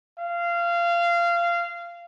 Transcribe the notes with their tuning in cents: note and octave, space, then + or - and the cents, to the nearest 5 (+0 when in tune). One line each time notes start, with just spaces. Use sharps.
F5 -20